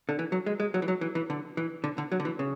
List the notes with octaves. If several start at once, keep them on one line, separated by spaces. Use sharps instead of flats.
D3
E3
F#3
G#3
G#3
F#3
E3
F#3
E3
E3
D3
E3
D3
D3
F#3
D3
E3
C#3